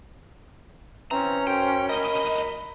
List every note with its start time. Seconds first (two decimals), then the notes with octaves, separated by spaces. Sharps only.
1.11 E3 C4 C#4 A#5
1.47 F#2 C5 G5
1.89 D2 A#4 D#5 B5